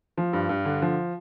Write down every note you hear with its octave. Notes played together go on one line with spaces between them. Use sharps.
F3
G2
G2
D3
F3